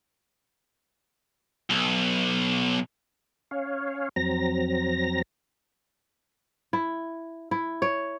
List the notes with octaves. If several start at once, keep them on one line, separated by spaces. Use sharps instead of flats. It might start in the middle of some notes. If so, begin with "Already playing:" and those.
B1
C#4 C#5 F5
F2 F#3 C4 A#5 A#6
E4
E4
C#5